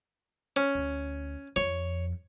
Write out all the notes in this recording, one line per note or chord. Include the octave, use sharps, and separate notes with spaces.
C#4
D2
F2 C#5